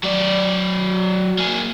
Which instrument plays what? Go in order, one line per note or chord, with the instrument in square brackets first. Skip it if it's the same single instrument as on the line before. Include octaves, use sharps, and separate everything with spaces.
[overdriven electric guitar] F#3 D5
A#3 G#4